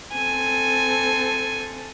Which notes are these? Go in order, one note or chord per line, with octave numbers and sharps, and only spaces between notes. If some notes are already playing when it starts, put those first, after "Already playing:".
C4 A4 G#5